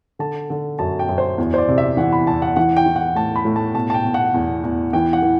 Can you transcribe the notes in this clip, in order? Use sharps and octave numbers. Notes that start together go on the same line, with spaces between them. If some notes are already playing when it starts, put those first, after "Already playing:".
D3 A5
D3
F#2 A5
G5
F#2
C5
E2
C5
D5
C3
E5
E3 F#5
B5
E2 A5
F#5
E3 F#5
G5
E3
F#5
A2 A5
B5
A2
A5
B2 A5
A5
G5
B2
F#5
E2
E2
E3 G5
F#5
E3